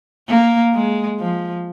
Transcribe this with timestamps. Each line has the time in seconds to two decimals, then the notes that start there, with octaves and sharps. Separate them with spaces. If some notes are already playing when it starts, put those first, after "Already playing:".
0.28 A#3
0.74 G#3
1.20 F3